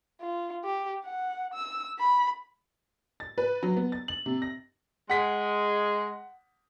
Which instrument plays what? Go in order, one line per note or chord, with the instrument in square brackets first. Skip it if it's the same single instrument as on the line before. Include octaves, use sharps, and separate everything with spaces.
[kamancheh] F4
G4
F#5
E6
B5
[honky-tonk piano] A6
B4
F#3
B3
A6
F#7
C3
A#6
[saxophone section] G#3 [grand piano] F#5 B6